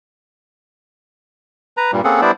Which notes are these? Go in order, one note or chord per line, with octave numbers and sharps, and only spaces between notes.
B4 A#5
G2 A#2 G3
A#3 C4 C#4 G#4 A4 F#5
G3 B3 D4 E4 C5 D5